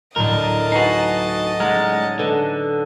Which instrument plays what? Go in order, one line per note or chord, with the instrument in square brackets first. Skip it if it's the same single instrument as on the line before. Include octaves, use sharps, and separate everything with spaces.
[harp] D2 A2 F#3 [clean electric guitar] D4 A#4 [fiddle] D#5 A5
[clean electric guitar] D#4 F#4 [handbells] B4 G#5 C7
[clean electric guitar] G#3 [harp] C#4 D#4 D5 [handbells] F#5 A#5 F6
[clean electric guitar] D3 [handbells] A4 B4 [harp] D#5 A5